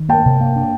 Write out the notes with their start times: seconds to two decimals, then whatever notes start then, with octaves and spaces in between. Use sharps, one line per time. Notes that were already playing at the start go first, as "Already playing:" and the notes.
Already playing: D#3
0.09 A#3 G5 A5
0.25 C3
0.41 A#3
0.56 D4